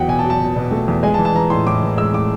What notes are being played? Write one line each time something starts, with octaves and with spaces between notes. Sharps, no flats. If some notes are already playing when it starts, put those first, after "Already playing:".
Already playing: E2 F#3 F#5 G5
B2 G#5
A5
F#3
A5
B2
B2
A3
E2
G#3 G#5
A5
E3
A5
E3 A#5
A2 C6
A2 D6
E3
G#3 E6
A2 D6